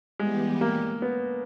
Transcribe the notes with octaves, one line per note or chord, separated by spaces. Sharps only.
E3 G3 G#3 B3 G4
A#3
B3